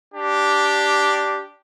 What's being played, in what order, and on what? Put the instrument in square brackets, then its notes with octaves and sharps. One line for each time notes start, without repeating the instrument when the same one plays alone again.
[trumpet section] D4 G4